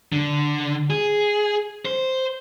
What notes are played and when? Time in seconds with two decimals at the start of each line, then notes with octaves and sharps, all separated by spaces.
0.12 D3
0.90 G#4
1.85 C5